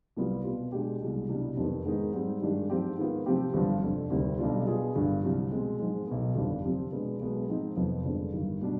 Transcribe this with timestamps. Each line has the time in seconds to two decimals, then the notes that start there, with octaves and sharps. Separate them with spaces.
0.17 C2 C3 G3 B3 F4
0.44 B2 B3 F4
0.72 B2 G#3 D4 G4
1.00 C2 B2 G#3
1.29 C2 B2 G3 D4
1.57 F2 C3 D#3 B3
1.85 G#2 D#3 G#3 B3 D#4
2.13 G#2 G3 C4
2.42 G2 D#3 G#3 D4 G4
2.70 G#2 F3 C4 G4
2.97 G#2 D#3 B3 F4
3.26 C3 F3 C4 G4
3.54 G1 G2 F3
3.82 F1 F2 D3
4.10 D2 C3 D#3 G3
4.39 B1 B2 G3 D4 F4
4.67 B2 B3 F4 G#4
4.95 G1 G2 D3
5.23 C2 C3 F3
5.52 B2 G#3 C4
5.79 G#2 F3 G#3
6.07 B1 B2 B3
6.35 G1 F2 D#3 G3 D4
6.64 C3 F3 C4 G4
6.92 B2 G#3 B3 D4
7.20 B1 B2 G#3 B3
7.48 G#2 F3 C4 D#4
7.76 F1 F2 C3 F3 B3
8.05 G1 F2 D3 G#3 B3
8.33 G1 G2 D#3
8.61 B2 G3 D4